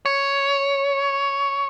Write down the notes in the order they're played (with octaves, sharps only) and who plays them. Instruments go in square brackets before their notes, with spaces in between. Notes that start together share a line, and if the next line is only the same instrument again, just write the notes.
[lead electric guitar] C#5